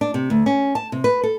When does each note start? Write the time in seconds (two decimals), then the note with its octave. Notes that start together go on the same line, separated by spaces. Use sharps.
0.01 D4
0.14 C3
0.30 D2
0.46 C#4
0.75 A5
0.92 C3
1.04 B4
1.23 A4